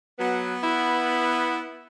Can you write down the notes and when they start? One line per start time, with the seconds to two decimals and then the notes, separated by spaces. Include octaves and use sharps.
0.19 F#3 B3
0.63 E4